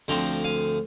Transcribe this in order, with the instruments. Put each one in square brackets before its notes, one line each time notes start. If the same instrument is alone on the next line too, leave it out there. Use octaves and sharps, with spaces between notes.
[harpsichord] D2 D3 F3 C4 G5 A#5
F5 G#5